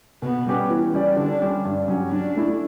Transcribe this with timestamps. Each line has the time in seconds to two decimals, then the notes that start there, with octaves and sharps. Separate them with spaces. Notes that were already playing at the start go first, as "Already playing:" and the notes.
0.22 B2 B3
0.47 G3 C#4 G4 B4
0.70 E3
0.94 G3 C#4 G4 D5
1.17 D3 D4
1.41 G3 C#4 G4
1.65 G2
1.88 F#3 C#4 G4
2.11 F#3 D4
2.36 A3 E4